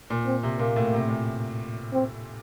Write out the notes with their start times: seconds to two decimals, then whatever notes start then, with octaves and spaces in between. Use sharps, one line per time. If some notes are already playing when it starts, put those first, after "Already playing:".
0.10 A#2
0.26 C4
0.43 C3
0.59 A#2 A#3
0.76 A2
0.93 C3
1.09 A#2
1.93 C4